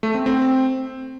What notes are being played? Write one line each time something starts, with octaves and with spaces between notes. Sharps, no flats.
A3
C4
C4